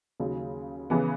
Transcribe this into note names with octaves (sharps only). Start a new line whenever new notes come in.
D#2 C#3 F#3
C#3 E3 B3